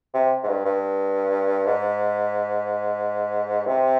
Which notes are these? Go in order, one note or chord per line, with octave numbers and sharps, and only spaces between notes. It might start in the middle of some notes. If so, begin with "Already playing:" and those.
C3
G#2
G2
G2
G#2
C3